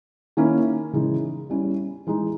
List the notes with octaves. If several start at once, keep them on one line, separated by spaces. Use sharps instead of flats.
D#3 A#3 C#4 E4
C#3 E3 G#3 D#4
G3 C#4 E4
E3 G#3 D#4